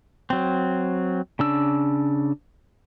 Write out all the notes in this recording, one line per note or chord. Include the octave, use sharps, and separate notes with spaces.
F#3 C4
C#3 D4 E6